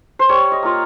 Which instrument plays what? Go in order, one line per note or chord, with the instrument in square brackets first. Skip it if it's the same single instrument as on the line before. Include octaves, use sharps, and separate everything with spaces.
[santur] C5
G3 C#5
D#5
A#3 F4